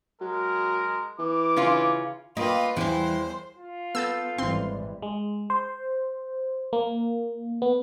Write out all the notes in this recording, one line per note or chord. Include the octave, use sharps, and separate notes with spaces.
F#3 G#3 A#4
E3 D6
C#3 C#4 F4
A#3 F4 B4 D#5 G5
E2 E3 G3 C5
F4
B3 A4 E6 G6 A6
G#1 E3 G3 C4 C6
G#3
C5
A#3
B3